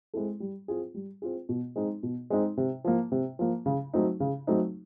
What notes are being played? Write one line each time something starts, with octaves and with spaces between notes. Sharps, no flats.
G#3 C4 E4 A4
G3
C4 F4 G#4
G3
C4 F4 G#4
B2
G#3 C4 D#4
B2
G#3 C4 D#4
C3
F3 A#3
C3
F3 A#3
C#3
F#3 A3 C4 D#4
C#3
F#3 A3 C4 D#4